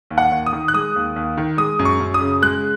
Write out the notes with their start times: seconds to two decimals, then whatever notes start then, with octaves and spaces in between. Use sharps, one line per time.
0.10 D#2
0.18 F#5
0.31 D#2
0.46 D#6
0.53 D#3
0.68 F#6
0.74 G#3 D#6
0.95 D#2
1.16 D#2
1.38 D#3
1.57 G#3 D#6
1.79 F#2
1.85 C#6
2.00 F#2
2.14 D#6
2.20 C#3
2.42 G#3 F#6